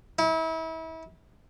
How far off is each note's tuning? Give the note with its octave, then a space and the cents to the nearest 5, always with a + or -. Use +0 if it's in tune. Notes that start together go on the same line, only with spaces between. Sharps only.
E4 -35